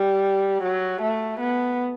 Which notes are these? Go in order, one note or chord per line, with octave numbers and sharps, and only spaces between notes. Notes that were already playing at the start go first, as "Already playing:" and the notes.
Already playing: G3
F#3
A3
B3